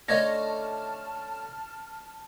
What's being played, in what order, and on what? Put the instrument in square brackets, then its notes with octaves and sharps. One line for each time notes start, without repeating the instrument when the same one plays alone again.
[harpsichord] D3 A3 C#4 [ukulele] C#5 D#5 [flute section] A5 F6 [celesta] A#6